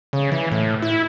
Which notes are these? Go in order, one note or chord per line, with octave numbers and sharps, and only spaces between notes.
C#3
E3
A2
E4